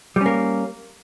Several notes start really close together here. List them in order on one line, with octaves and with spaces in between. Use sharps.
G3 C#4 A#3